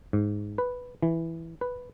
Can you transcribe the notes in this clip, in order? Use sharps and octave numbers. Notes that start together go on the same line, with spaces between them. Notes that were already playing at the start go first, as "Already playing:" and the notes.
G#2
B4
E3
B4